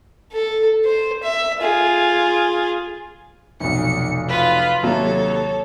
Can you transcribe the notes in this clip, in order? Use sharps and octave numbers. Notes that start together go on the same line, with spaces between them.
A4
C5
E5
F4 G#4
F1 B1 C#7
F4 B4
D#2 C3 F#3 A4 C#5